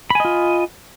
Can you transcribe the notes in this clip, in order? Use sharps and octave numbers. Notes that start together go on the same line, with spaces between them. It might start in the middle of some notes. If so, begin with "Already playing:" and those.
F4 D#5 G#5 B5